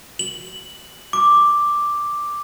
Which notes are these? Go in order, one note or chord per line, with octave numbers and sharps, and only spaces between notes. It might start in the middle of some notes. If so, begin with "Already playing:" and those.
F#7
D6